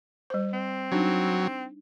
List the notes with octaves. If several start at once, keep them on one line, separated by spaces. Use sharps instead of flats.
G3 C5
C4
F#3 D4 D#4